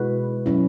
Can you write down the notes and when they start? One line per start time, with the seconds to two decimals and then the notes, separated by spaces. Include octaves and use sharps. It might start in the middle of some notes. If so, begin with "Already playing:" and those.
Already playing: B2 G#3 E4 F#4 B4
0.46 F#3 C#4 E4